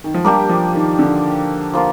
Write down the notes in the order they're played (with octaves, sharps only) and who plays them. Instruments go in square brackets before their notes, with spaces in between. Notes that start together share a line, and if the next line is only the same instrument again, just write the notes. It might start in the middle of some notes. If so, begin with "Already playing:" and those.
[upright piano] D#3
F3
[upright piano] G3 [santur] A#3 D4 G4
[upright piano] F3
D#3
D3
[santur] F3 A#3 F4